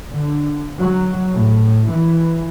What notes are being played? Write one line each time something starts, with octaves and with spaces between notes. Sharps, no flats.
D3
F#3
A2
E3